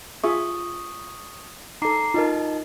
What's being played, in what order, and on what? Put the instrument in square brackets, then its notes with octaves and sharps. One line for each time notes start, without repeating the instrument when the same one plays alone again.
[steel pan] F4 G#4 E5 [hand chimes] C#6 D#6
[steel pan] D#4 A4 [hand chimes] A#5 D6 C7
[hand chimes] D#4 D#5 A5 [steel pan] F4 A#4